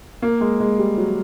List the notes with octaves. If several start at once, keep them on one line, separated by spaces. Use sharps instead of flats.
A#3
G#3
G#3
G3
F#3